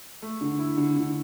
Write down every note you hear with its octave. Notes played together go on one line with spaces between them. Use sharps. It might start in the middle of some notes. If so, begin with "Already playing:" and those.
A3
D3
E4
D3
D3